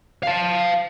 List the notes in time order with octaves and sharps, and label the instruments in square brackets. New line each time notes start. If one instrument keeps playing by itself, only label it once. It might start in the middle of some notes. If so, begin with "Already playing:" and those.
[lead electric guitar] F5 A5